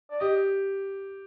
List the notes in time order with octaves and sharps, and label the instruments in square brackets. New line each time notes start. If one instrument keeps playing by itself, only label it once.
[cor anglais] D5
[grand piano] G4 [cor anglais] D#5